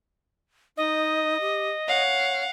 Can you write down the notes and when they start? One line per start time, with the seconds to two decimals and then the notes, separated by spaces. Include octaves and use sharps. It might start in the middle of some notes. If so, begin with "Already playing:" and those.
0.77 D#4 D#5
1.41 G4
1.88 C#5 F5 F#5